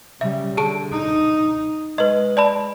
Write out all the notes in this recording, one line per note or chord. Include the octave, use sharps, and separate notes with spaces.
C#3 G3 E5
D3 G#4 A5 D7
D#4
G#3 B4 D#5
D5 A5 B5